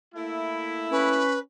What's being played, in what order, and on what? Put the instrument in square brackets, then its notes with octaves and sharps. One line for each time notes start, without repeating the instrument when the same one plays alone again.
[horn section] A3 A#3 E4
[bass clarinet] C#4 [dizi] B4